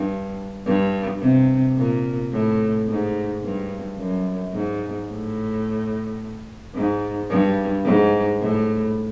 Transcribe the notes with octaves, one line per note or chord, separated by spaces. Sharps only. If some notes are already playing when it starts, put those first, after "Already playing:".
Already playing: G2
G2
C3
A#2
A2
G#2
G2
F#2
G#2
A2
G#2
G2
G#2
A2